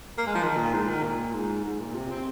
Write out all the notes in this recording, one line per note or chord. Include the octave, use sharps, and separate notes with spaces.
A#3
G#3
F3
D#3
A#2
G#2
D#3
A#2
G#2
G#2
A#2
C3
C4